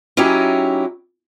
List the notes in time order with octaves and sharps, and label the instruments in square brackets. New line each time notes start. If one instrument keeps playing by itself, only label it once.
[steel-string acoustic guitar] F#3 C#4 D#4 E4 G4